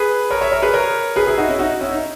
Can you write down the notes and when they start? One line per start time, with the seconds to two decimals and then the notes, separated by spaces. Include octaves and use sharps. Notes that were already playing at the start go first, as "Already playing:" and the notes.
Already playing: G#4 B4
0.31 A#4 C#5
0.41 C#5 E5
0.52 A#4 C#5
0.62 G#4 B4
0.73 A#4 C#5
1.16 G#4 B4
1.27 E4 G#4
1.38 D#4 F#4
1.48 C#4 E4
1.59 D#4 F#4
1.81 C#4 E4
1.91 D#4